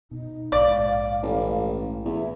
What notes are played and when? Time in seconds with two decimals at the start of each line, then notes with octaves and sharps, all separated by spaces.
0.11 B2 D#4
0.52 A#1 G#2 D5 F5
1.23 A1
2.06 E2 E5